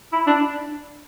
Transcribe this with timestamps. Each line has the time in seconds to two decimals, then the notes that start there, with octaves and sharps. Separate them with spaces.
0.13 E4
0.27 D4